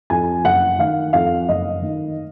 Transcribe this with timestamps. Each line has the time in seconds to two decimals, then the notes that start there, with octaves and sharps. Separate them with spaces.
0.10 F2 G#5
0.45 F#1 F#5
0.79 D#3 F5
1.13 F2 F5
1.49 F#1 D#5
1.82 D#3